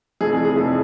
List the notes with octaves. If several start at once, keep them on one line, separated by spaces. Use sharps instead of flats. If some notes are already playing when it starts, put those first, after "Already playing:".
F1 F2 E3 A3 G#4
G#4
G#4
F1 F2 E3 A3